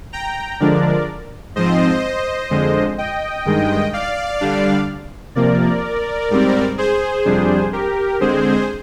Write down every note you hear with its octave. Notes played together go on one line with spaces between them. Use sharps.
G5 A#5
D3 F3 G#3 D4 A#4 D5
G#2 F3 C4 C5 D#5
F2 D3 G#3
D#5 G5
G2 D#3 G#3
D5 F5
D3 G3 D4
C3 F3 A#3 A#4 D5
G#2 G3 C4
G#4 C5
F2 C3 G3 D4
G4 A#4
D3 G#3 C4 G#4 C5